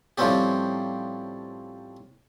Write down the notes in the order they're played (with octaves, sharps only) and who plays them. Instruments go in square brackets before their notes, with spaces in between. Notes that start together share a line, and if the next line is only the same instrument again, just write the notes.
[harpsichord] A2 F3 G3 C4 C#4 G4